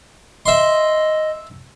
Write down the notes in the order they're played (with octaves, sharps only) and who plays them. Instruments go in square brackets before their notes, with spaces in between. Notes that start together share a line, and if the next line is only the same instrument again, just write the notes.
[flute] D#5 [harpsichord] E5 C6